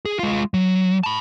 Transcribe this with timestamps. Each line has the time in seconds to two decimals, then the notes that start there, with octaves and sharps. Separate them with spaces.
0.05 G#4
0.19 G#3 F4
0.54 F#3
1.03 A5 B5